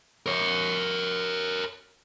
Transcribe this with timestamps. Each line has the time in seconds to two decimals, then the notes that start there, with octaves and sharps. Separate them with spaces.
0.26 A#4 C#5